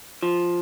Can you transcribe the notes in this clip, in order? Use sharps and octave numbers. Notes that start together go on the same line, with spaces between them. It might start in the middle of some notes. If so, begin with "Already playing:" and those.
F3